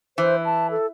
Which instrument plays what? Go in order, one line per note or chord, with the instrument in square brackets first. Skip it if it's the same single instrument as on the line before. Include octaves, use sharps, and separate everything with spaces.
[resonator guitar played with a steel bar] E3 [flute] C5
[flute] A5
A4